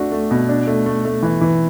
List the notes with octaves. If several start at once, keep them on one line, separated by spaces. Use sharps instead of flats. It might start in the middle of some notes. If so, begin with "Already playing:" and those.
Already playing: A3 D4 F#4
A3
B2
D4
A3
A3
A3
E3
E3